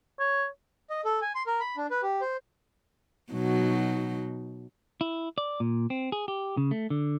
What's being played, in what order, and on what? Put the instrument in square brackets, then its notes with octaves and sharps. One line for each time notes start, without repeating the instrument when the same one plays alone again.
[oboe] C#5
[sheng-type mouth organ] D#5
A4
G#5
C6
A#4
B5
D4
B4
G4
C5
[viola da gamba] B2 F#3 D#4
[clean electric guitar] E4
D5
A#2
C4
G#4
G4
C#3
A3
D3